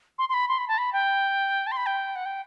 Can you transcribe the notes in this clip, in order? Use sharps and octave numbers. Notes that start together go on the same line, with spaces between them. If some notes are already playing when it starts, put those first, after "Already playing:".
C6
C6
B5
C6
B5
A5
B5
G5
A5
C6
B5
G5
F#5
G5